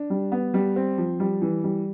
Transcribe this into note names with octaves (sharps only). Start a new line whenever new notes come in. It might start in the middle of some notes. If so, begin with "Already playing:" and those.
Already playing: D4
G3
B3
G3
C4
F3
G3
E3
G3